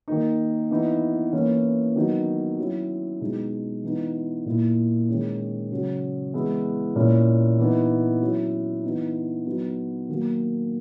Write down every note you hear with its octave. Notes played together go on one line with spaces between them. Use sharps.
D#3 A#3 D#4
E3 B3 D#4
E3 A#3 C#4 E4
D#3 F#3 B3 D#4
F#3 C#4 E4
B2 G#3 D#4
E3 B3 D#4
A#2 A#3 E4
D#3 G#3 C#4
C#3 F#3 C#4
E3 G#3 B3 E4
A#2 A#3 C#4 E4
E3 B3 D#4
F#3 C#4 E4
E3 B3 D#4
F#3 B3 D#4
D#3 F#3 A#3